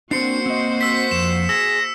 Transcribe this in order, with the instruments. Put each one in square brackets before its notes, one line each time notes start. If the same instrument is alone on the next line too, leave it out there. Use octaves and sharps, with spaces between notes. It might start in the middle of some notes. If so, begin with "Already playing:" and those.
[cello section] A#3 F#4 C5 [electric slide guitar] C4 D4 [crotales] C7 C#7
[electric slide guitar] C4 D#5
[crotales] E6 B6
[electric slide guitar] F2 [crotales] E7
[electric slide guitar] G#4 [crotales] E6 [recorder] A#6